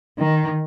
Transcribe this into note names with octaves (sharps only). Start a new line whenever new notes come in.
D#3